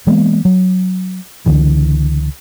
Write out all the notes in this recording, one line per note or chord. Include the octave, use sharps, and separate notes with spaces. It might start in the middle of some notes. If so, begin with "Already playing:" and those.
E3 G#3 A#3 B3
F#3
C#2 D3 E3